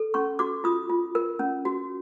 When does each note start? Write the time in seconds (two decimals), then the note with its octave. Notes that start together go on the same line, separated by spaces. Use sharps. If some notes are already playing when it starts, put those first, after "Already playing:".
Already playing: A4
0.14 C#4 C#6
0.39 F#4 D6
0.64 F4 D#6
0.90 F4
1.15 A#4
1.39 C#4
1.65 F#4